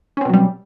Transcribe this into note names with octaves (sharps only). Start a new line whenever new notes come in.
B2 F#3 G3 C4 C#4